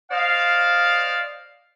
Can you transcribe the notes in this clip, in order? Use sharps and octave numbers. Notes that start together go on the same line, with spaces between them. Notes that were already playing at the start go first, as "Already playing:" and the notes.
C5 D5 D#5 F5